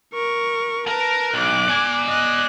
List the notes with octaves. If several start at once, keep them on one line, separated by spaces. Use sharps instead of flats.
A#4 C#6
A#4 B4 A5
B1 D6 F#6
D5 G#5
D#5 F#6